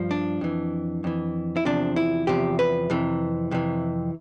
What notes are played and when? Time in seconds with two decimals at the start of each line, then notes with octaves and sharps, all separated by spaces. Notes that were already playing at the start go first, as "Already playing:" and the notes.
Already playing: G2 F3
0.11 D4
0.41 F2 E3
1.04 F2 E3
1.57 E4
1.65 E2 C3 F3 D4
1.96 E4
2.27 E2 C3 F3 G4
2.59 B4
2.90 F2 C3 E3
3.51 F2 C3 E3